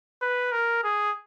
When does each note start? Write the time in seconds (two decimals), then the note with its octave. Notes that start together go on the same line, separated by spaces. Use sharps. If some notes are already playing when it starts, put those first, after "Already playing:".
0.22 B4
0.52 A#4
0.83 G#4